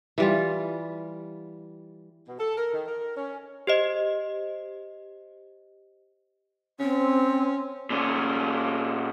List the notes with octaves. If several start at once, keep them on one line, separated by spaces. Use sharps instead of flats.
E3 G3 F4
B2
A4
A#4
D#3
A#4
C#4
G4 C5 D#5
C4 C#4
A#2 C#4